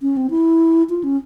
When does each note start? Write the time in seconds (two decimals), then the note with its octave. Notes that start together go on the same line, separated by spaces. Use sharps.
0.02 C#4
0.17 C4
0.30 E4
0.89 F4
1.04 C#4